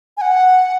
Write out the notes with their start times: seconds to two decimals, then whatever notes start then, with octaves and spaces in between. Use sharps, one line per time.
0.17 G#5
0.21 F#5